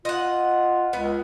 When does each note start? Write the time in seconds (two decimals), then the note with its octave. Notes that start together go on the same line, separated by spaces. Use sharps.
0.05 F4 D#5 F#5
0.93 C#2 B3